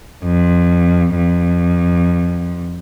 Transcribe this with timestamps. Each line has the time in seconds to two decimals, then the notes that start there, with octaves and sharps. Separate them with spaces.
0.23 F2
1.15 F2